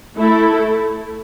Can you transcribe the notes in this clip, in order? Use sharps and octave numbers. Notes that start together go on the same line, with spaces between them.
A3 E4 A4